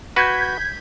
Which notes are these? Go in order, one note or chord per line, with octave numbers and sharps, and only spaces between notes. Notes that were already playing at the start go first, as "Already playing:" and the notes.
F#4 B4 G6 G#6 B6